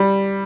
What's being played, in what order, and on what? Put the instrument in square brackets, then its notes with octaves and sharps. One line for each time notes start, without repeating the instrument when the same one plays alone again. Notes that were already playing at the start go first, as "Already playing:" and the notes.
Already playing: [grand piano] G3